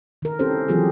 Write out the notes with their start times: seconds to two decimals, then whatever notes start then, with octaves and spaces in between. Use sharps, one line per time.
0.22 D#3 A#4
0.39 C4 C#4 E4 G4 A4 C5
0.68 E3 F#3 C4 F4 G4 G#4